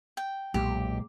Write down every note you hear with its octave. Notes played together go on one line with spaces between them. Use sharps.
G5
B1 F#2 A#2 G#3 G4